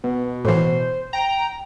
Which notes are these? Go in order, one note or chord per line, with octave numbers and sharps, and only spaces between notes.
B2
A2 E3 C5
G5 A#5